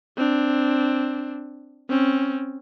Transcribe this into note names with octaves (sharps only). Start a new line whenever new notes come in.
C4 D4
C4 C#4